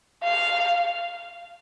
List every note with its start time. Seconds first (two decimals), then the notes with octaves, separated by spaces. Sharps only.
0.24 F5